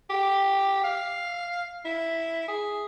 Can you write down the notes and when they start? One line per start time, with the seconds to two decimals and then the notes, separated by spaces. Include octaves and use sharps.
0.10 G4
0.84 F5
1.85 E4
2.48 G#4